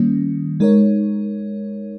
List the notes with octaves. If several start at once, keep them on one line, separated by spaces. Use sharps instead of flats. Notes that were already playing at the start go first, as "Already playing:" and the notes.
Already playing: D#3 G3 A#3 C#4
G#3 D#4 A#4 C#5